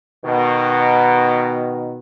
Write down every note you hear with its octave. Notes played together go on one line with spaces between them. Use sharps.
B2 D#3